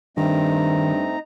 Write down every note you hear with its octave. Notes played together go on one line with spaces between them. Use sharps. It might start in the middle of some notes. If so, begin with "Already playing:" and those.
G2 D#3 A3 C4 D#4 A#5